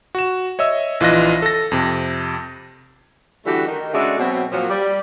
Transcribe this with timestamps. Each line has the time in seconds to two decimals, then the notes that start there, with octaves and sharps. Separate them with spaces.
0.15 F#4 E7
0.59 C#5 D#5 E5 E6
1.00 A#1 E3 F4 D#5 F#6 A#6
1.42 A4 A#6
1.72 F2 C3
3.45 D3 E3 G3 A3 F#4 G4
3.67 D#3
3.94 C#3 G#3 A3 D4 F#4 A4
4.18 B2 F#3 C4
4.52 A#2 F3 F#3
4.70 G3 D5